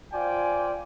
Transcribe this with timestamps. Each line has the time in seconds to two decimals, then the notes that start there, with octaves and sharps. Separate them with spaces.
0.13 F4 C5 D5 G5 G#5